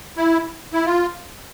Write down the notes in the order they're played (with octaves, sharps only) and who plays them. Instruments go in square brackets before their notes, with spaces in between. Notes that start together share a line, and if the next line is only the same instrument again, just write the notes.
[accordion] E4
E4
F4